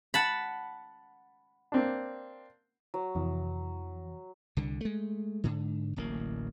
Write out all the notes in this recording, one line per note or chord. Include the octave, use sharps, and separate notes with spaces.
F#5 A5 B5
A#3 C4 D4
F#3
F2 C3 E3
C2 D3
G#3 A3
G#2 D3
D1 A1 A#3